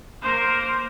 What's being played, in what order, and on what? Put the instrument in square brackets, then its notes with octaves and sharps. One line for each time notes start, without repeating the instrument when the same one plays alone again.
[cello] A#3 A#4 [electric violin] C5